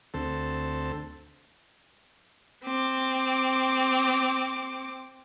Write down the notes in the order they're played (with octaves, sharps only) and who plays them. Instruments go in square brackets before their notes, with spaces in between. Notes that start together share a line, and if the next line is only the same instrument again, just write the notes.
[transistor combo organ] D2 C4 A4
[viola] C4 D6